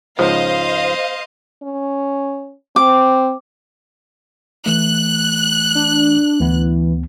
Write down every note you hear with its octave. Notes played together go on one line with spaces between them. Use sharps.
C#2 G#2 F3 C5 D#5 F5
C#4
C4 D6
E3 A3 F#6
D4
D2 E3 B3